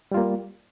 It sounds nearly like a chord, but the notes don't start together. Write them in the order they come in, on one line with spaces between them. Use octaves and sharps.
G3 F4 A#3